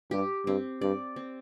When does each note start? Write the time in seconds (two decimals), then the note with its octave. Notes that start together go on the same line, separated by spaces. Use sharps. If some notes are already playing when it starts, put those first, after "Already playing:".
0.11 G2 G4
0.46 G2 C4
0.81 G2 D5
1.16 C4